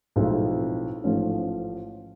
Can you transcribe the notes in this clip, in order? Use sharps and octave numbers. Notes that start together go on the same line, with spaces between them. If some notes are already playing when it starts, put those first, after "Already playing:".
B1 A2 F3 G#3 C4
A1 G#2 F3 A3 C#4